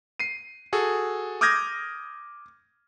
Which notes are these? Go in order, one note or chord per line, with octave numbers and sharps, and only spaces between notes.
C7 D#7
F#4 G#4 A4
D6 D#6 F6 G6 G#6 A#6